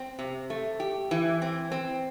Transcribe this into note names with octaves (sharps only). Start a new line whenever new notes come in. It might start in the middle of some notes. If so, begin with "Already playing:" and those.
Already playing: C4
C3
A3
G4
E3
C4
C4